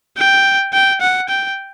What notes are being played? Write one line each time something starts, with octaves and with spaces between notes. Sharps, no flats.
G5
G5
F#5
G5